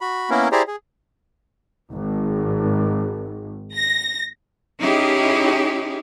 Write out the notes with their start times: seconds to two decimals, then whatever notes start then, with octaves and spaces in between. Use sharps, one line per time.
0.01 F#4 B5
0.30 A#3 B3 C#4 E4 A#4
0.52 E4 G4 G#4 C5 D5 A#5
0.68 G#4
1.93 G#1
3.75 A#6
4.79 C#4 D#4 E4 G4 G#4